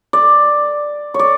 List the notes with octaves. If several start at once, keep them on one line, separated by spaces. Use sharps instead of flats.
D5
C#5
D5